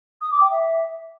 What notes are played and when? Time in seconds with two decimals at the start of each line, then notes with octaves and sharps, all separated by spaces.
0.21 D#6
0.31 D6
0.41 G5
0.51 E5